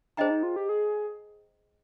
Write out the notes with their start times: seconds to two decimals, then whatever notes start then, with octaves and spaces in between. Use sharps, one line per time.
0.17 D4 G#4 C5 D#5 G5 A#5
0.30 D#4
0.43 F4
0.56 G4
0.69 G#4